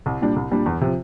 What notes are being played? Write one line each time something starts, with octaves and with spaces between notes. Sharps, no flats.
C2
A#2 G3 D4
C2
A#2 G3 D4
E2
C3 F3